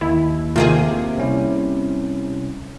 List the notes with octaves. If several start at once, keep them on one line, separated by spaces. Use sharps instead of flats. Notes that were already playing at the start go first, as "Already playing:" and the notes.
D#2 E4
C3 D#3 A3 A#3 F4 G#4
C2 C#4 E4